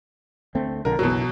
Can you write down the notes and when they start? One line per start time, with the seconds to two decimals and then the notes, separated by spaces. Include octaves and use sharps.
0.55 D2 A3 C4
0.85 A#1 D3 A#4
0.99 F#1 B1 B2 E3 F#3